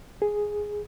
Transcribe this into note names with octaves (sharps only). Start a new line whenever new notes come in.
G#4